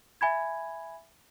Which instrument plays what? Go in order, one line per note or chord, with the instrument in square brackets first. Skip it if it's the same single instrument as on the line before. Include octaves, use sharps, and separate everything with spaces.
[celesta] E5 G#5 B5 G#6